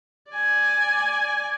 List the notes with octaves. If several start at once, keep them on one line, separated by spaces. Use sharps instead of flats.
D5 G#5